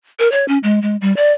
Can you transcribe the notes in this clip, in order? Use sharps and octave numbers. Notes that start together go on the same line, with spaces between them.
A#4
C#5
C#4
G#3
G#3
G3
D5